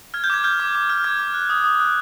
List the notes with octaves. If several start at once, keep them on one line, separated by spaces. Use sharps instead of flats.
F6 G#6
G6
D6 G#6
F6 G6
D6
D6
F6
D6 G#6
D6
F#6
D#6
D#6
F#6